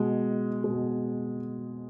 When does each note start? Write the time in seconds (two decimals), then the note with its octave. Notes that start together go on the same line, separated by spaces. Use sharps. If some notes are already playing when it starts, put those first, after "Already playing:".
Already playing: B2 G#3
0.64 B2 G#3